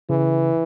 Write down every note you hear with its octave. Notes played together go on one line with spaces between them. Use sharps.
C#3 E3